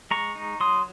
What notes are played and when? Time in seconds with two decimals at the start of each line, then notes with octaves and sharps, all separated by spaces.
0.11 G#3 A#5 C#6
0.35 D#4
0.60 F#3 C6 D#6